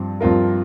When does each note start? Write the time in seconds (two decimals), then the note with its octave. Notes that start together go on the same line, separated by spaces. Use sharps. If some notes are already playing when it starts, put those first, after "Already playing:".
Already playing: G2 F3 C4
0.21 G2 F3 C4 F4 A#4